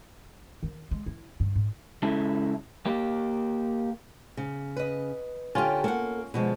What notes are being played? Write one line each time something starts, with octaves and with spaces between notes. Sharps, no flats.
D#3
G#3
E4
G2
G#2
C#3 G#3 E4 A4
A#3 G4
C#3
B4 D#5
D3 C#4 F4 G4
A#3 A4 F#5
B2 D3 F3 G#3